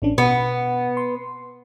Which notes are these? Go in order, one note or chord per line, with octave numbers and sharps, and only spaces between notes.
A1 C#4 D4
B2 B3
C6